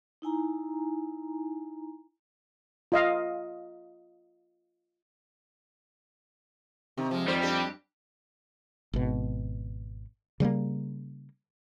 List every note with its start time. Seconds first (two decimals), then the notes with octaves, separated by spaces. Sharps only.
0.22 D#4 E4 G#5 A#5
2.92 F4 D#5 F5
6.97 C3 D#3
7.11 F3 G#3
7.27 F2 D#3 G3 C5
7.41 C4 D4 G4
8.93 G#1 B2
10.40 C#3 G3 G#3 A#3